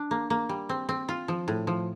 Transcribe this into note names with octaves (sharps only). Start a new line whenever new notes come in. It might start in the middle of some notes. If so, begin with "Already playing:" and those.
Already playing: D4
A#3
A#3
G3
C4
C4
F4
F3
A2
F3